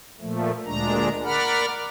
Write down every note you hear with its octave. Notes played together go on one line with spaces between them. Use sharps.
A#2 F3 A3
D2 A#2 G#3 D4 A#5
A#4 D5 F#5 B5 F6